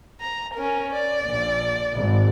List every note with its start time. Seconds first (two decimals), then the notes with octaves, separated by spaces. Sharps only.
0.21 A#5
0.54 C#4 A#4
0.93 D5
1.25 A#1
1.94 G#1